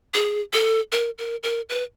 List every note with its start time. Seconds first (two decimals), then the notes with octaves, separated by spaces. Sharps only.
0.14 G#4
0.53 A4
0.92 A#4
1.18 A#4
1.43 A#4
1.69 B4